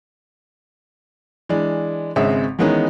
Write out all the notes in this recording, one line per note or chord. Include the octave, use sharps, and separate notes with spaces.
E3 G#3 D4
G#1 C#3 G#3 C4 C#5 E5
D#3 E3 G#3 B3 C#4 D#4